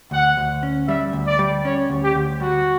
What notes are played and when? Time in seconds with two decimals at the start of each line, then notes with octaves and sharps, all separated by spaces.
0.11 D2 F#5
0.37 D2
0.63 C#4
0.87 G3 E5
1.13 D2
1.26 D5
1.39 G3
1.64 C#4 C#5
1.90 D2
2.02 G4
2.15 D2
2.40 G3 F#4